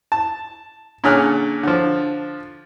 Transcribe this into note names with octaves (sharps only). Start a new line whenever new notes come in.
A5
A#2 D3 C#4 G#4 F6 F#6
D3 F3